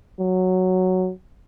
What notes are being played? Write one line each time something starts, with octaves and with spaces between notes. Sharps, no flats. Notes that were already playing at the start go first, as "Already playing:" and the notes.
F#3